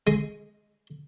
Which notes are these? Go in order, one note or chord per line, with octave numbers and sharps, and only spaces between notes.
G#3